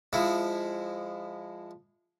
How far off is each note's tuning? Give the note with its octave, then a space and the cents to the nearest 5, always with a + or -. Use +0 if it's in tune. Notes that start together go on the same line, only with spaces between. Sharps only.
F3 +0 G#3 -20 E4 +0